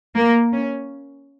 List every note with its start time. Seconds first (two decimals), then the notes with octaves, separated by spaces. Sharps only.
0.15 A#3
0.52 C#4